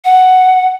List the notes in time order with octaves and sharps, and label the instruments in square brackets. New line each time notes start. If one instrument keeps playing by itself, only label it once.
[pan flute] F#5